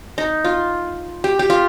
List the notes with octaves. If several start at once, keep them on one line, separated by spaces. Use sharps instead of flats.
D#4
F4
G4
G4
F4